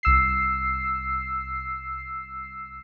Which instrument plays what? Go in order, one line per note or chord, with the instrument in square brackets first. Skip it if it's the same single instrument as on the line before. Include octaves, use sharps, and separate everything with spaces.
[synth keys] C2 E6 C7